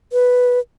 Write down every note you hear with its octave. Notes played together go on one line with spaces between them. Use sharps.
B4